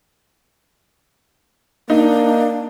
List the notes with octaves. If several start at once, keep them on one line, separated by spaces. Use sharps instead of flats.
A#3 D4 D#4